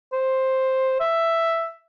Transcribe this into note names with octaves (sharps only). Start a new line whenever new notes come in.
C5
E5